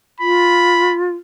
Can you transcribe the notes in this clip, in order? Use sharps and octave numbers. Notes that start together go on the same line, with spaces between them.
F4 B5